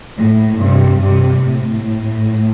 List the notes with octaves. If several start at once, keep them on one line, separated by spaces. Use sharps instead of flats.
A2
G2 C3
G2 C3
A2